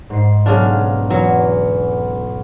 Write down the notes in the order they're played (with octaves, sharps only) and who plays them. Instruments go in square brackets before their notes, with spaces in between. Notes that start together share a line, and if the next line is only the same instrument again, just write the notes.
[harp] G#2 C7
[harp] B1 F5 [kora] C#3 D4
[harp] E2 [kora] F#3